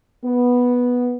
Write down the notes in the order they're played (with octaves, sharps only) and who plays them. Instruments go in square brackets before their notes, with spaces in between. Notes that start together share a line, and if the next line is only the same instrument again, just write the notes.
[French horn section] B3